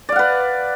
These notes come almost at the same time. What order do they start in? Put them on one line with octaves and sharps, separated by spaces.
D5 F5 F#5 B4